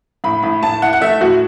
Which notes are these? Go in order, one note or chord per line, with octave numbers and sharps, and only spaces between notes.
A2 B5
A2 B5
A2 A5
E4 F#5
F#5
A3 E5
A2 F#4